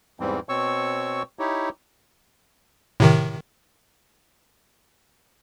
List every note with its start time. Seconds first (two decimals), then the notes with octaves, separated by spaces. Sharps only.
0.20 E2 G#2 E3 G3 C4
0.49 B2 C4 C#5 C#6 E6
1.39 D#4 E4 G4 C#5
3.00 A2 C3 D#3